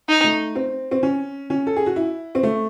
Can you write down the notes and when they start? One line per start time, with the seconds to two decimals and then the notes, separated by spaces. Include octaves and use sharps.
0.09 D#4
0.24 A3
0.55 C4
0.91 C4
1.03 C#4
1.50 C#4
1.67 A4
1.76 G#4
1.86 F#4
1.96 E4
2.35 C4
2.43 A3